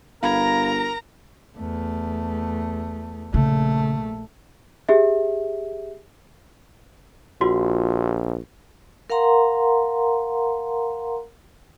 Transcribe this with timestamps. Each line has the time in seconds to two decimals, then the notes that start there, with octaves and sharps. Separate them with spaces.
0.23 G1 A#4 F5 A#5 B5 G#6
1.58 E2 A3
3.34 A#1 C#3 A3
4.89 G4 G#4 E5
7.41 A#1 F4 F#4 C6
9.10 A#4 F5 F#5 A#5 C6